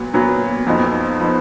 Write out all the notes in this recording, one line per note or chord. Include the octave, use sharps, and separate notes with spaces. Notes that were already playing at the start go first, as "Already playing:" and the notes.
Already playing: A#2 F#3 B3
A#2 F#3 B3
F2 F3 B3 D#4
F3 B3 D#4